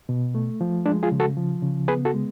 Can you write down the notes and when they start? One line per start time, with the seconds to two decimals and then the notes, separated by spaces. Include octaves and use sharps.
0.09 B2
0.35 A3
0.61 F3
0.86 G#3 D4
1.03 F4 G#4
1.12 C#3
1.20 F#4 A4
1.37 F3
1.62 C#3
1.88 B3 G#4 B4
2.05 F#4 A4
2.14 G#3